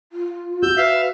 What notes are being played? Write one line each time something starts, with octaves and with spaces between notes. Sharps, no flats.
F4
F#4 E6 G6
B4 E5 F5